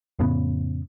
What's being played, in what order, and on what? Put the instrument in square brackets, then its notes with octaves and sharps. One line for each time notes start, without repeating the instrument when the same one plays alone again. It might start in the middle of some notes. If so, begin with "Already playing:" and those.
[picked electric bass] F2 A2 C#3 B3